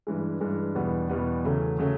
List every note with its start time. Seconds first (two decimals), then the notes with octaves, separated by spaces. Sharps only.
0.07 G2 E3 G#3
0.41 G2 E3 G#3
0.75 E2 B2 G3 B3
1.09 E2 B2 G3 B3
1.44 E2 C#3 F#3 A3
1.79 C#3 F#3 A3